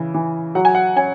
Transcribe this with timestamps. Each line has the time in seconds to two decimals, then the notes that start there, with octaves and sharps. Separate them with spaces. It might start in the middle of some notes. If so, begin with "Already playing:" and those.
Already playing: C#3 E3
0.14 E3
0.55 F#3 F#5
0.65 G#5
0.75 F#5
0.96 C#4 G#5